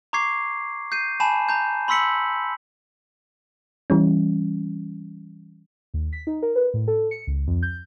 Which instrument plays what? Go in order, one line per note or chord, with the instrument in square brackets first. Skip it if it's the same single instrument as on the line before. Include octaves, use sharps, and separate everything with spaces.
[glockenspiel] A#5 C#6 D6 G#6 C7
G6 C7 D#7
G#5 A5 B5 E7
A#5 G6
B5 C6 E6 B6 C#7 F#7
[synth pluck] E3 G3 C#4
[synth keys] D#2
B6
D#4
A#4
B4
A2
A4
C#7
C#2
F2
G6